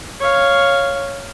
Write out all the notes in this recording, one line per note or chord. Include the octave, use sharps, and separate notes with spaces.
C#5 F5